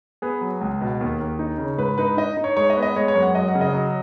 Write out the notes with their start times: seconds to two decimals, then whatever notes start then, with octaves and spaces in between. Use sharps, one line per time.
0.22 B3 G#4
0.41 F#3
0.61 C#2
0.81 B2
1.01 D#2
1.20 D#2
1.39 D#4
1.58 C#3
1.78 G#2 B4
1.98 D#4 B4
2.17 D#4 D#5
2.37 D#4
2.44 C#5
2.57 G#3 C#5
2.70 D#5
2.77 B3
2.83 D#5
2.96 G#3 C#5
3.08 C#5
3.15 F#2
3.22 F#5
3.35 F#3 D#5
3.48 F#5
3.55 C#3
3.61 D#5
3.73 F#3